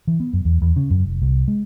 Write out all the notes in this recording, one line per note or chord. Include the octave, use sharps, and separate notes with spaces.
E3
B3
F#2
E2
E2
C#3
F#2
F1
C2
G#3